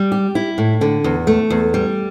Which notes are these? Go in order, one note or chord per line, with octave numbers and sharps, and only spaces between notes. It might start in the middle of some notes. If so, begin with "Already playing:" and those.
Already playing: G3
G4
E4
A2
D3
E2
A3
E2
G3